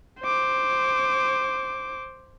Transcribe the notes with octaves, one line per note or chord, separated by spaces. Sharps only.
C5 D6